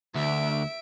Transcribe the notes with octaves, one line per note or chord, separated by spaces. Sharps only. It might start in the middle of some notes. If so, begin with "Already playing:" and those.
D2 E5 D7